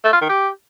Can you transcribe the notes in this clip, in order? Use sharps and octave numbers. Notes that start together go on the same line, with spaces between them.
A3
F4
D#3
G4